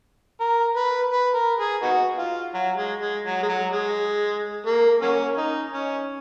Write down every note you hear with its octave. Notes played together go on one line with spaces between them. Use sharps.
A#4
B4
B4
A#4
G#4
B3 D#4 F#4
F4
F#3
G#3
G#3
F#3
G#3
F#3
G#3
A#3
F#3 A#3 C#4
D#4
C#4